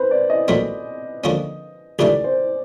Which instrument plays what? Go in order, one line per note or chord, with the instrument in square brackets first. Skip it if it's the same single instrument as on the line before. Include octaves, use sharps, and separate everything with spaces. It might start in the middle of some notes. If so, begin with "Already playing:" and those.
Already playing: [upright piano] B4 C5
D5
D#5
[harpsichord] A#2 F#3 A3 C4
D3 F3 A#3 C#4
[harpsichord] C#2 C3 E3 A3 D4 [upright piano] D5
[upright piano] C5